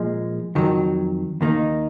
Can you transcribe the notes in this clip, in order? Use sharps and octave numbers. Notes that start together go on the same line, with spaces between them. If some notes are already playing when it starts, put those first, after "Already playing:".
Already playing: A#2 F3 G#3
F2 D#3 F#3
D#2 D#3 A#3 D#4